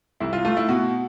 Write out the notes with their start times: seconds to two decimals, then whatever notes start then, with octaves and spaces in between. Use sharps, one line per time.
0.20 C2 E4
0.33 F4
0.45 A3 F4
0.57 E4
0.68 B2 F#4